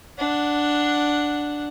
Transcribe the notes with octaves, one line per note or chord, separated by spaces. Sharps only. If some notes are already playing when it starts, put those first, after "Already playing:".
D4 F#5